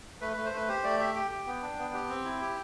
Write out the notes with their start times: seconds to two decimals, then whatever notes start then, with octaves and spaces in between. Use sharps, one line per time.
0.21 A3 B4
0.33 A3 B4
0.45 C5
0.53 A3 B4
0.68 G4 C5
0.84 A3 D5
0.99 G4 E5
1.15 G4 G5
1.31 G4
1.47 B3
1.62 D4
1.78 B3
1.94 G4
2.09 C4
2.25 E4
2.41 G4